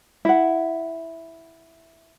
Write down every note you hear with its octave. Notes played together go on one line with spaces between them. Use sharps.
E4 F#5